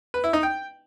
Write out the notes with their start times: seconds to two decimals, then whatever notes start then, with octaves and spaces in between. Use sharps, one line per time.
0.14 B4
0.24 E4
0.33 D#4
0.43 G5